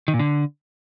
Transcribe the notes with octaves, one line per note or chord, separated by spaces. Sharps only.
D#3
A#2
D3